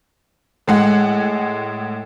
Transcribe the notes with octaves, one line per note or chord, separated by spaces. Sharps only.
A2 G#3 F#5